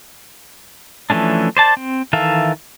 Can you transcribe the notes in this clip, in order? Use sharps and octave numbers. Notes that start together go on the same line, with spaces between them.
E3 F3 A3 C#4 D4
C5 D5 A5
C4
D#3 E3 A4 E5 F5